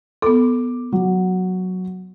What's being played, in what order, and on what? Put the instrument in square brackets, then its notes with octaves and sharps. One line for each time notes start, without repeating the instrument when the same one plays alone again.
[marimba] B3 A4 [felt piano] D6
[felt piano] F#3